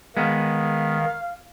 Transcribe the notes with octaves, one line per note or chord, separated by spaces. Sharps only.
D#3 G#3 B3 F5